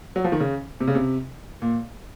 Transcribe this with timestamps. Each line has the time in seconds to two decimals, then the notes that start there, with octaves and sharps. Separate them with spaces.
0.16 F#3
0.24 F3
0.32 D#3
0.40 C#3
0.80 C3
0.88 C#3
0.95 C3
1.62 A#2